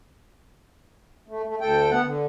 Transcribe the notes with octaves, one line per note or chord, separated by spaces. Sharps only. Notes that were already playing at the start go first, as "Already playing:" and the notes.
A3
A3
D2 A4 G5
B3 F#5
D3